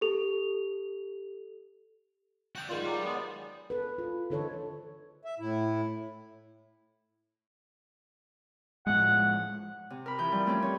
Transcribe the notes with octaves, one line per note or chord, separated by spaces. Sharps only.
G4 A4 F7
F#4 D5 F#5 G5 D#6
G#2 D#3 F4 D5 B5
F#3 G4
G#3 B3
A4 B4
F4
D3 E3 D#4 A4 C5 C#5
E5
A2 E4
A2 F3 G#3 F#5
C3
A#4 B5
E3 F3 G6
F3 G3
A3 C4 C#4 G4
C#5